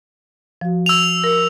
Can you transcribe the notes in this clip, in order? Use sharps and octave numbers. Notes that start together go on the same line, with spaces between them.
F3 F#4
E6 F7
A#4 A#6